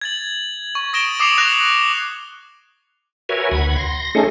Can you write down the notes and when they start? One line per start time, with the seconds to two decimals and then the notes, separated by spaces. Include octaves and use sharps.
0.02 G#6 A6 F#7
0.75 C#6
0.93 D#6 A#6 D7 E7 G7
1.20 D6 D#6 C7 C#7 F7 F#7
1.38 F#6 A#6 F7
3.29 F#4 A#4 B4 C#5 E5 G#5
3.51 D2 F#5 B5 G#6
3.77 C6 A#6
4.15 A3 C#4 D#4 G#4 A4